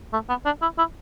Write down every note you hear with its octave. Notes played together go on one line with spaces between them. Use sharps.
A3
B3
D4
E4
E4